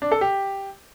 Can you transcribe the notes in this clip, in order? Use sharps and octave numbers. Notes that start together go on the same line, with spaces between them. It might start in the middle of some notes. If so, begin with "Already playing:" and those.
D4
A4
G4